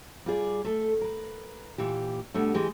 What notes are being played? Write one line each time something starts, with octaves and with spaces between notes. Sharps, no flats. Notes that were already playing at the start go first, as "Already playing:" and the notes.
G3 F4 G#4 D5
A3 A4
A#4 B4
A#2 E3 G4
B2 D3 G3 A3
E3 G#3 G4